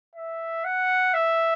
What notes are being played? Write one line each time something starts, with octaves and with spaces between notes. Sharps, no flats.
E5
F#5
E5